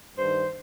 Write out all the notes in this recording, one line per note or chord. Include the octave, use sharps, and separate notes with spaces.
G2 D#3 C5